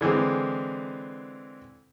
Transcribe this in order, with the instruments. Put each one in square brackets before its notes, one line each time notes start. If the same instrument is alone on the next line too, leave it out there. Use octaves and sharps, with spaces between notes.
[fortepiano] D3 E3 G#3 C4